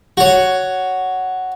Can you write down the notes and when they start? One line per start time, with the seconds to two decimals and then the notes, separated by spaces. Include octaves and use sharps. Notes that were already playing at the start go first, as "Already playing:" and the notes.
0.17 F#4 C#5